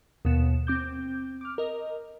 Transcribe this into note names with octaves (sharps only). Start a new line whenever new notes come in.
D#2 B2 B3 E7
C4 D6 G6
D6 F6
A#4 D#5